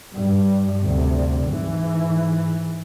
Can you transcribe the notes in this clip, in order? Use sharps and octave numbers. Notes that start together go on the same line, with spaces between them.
G2
D2 C3
G#2 E3